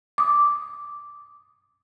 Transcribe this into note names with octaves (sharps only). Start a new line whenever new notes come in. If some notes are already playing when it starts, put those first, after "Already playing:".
D6 D#6